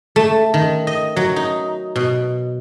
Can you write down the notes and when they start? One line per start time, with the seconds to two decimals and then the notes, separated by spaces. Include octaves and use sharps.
0.16 A3
0.54 D#3
0.87 D#5
1.16 F#3
1.36 D#4
1.96 B2